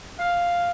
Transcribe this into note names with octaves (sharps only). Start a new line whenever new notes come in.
F5